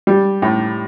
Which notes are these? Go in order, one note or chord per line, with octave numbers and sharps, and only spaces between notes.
G3
A2